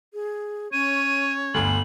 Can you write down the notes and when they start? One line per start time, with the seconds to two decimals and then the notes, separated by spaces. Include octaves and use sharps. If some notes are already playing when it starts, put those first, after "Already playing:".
0.14 G#4
0.73 C#4 C#5 D#7
1.54 G1 D2 F#7